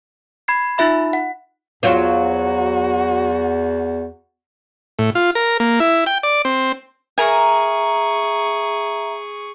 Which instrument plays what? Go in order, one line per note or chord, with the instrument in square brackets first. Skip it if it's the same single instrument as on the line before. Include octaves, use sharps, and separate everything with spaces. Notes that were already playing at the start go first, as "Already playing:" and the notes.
[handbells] B5 G#6 C7
D#4 F4 E5 B5
F#5
[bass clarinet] E2 [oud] F#3 F4 C5 [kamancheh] F#4
[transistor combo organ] A2
F4
A#4
A#3
E4
G5
D5
C4
[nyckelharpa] G#4 C#6 [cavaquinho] A#4 G#5 [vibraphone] E5 A#5